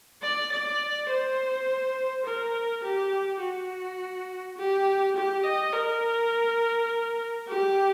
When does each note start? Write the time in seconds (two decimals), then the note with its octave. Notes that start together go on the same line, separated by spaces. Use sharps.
0.22 D5
0.52 D5
1.10 C5
2.25 A#4
2.83 G4
3.41 F#4
4.57 G4
5.16 G4
5.44 D#5
5.73 A#4
7.48 G4